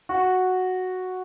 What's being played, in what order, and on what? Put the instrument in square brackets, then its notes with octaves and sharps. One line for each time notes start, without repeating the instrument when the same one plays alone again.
[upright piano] F#4